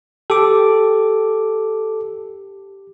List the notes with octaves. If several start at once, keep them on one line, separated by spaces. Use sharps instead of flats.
G4 A4 D6